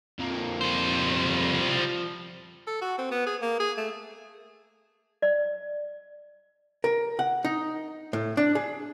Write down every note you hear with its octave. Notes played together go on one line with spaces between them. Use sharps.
F2 A#3
G3 C5
F3
A4
F#4
C4
B3
G#4
A#3
G#4
A3
D5
A#4
F#5
D#4
A2
D4
G#4